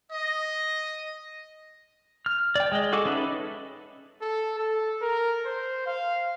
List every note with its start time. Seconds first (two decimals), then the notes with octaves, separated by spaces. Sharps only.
0.12 D#5
2.26 F6
2.55 D5 G5
2.72 G#3 D#5
2.93 F#4 G#4 A4 D6
3.05 C#4 D#4 A4 B4 E5
4.22 A4
4.59 A4
5.02 A#4
5.46 C5
5.87 F5